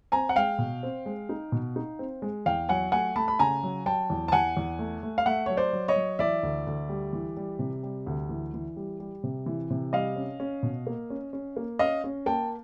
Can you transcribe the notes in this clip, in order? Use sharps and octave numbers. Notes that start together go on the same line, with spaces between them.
C4 G#5 A#5
F#5
G#3 F5 G5
B2
C4
G#3
D#4
B2
D#4
C4
G#3
E2 F5 G5
F#3 F#5 G#5
A3 F#5 G#5
A3 A5 B5
B5
C#3 G#5 A#5
F#3
F#3 G5 A5
E2
A5
E2 F#5 G#5
E2
A3
A3
F5
A3 E5 F#5
F#3 C#5
C5 D5
F#3
C#5 D#5
F#3
E3 D5 E5
D2
D2
G3
E3
G3
C3
G3
D2
E3
E3
G3
G3
C3
E3
C3
G3 D#5 F5
C#4
C#4
B2
A#3
C#4
C#4
A#3
C#4 D#5 F5
C#4
A#3 G5 A5